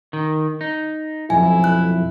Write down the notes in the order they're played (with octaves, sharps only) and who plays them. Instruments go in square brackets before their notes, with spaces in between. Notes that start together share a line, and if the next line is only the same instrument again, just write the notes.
[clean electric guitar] D#3
D#4
[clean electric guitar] B1 F2 [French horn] E4 [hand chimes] G#5
[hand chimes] F#6